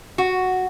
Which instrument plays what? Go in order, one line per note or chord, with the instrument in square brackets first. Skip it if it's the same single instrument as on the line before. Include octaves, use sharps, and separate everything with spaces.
[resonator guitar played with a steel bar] F#4